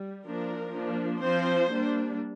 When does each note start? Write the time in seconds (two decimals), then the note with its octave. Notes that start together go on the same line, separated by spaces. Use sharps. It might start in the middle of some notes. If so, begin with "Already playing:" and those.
Already playing: G3
0.26 F3 A#3 D4 A#4
0.73 F3 A#3 D4
1.21 F3 C4 C5
1.69 G3 A#3 D4